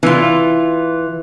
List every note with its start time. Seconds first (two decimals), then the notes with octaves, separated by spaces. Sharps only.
0.03 E3 F4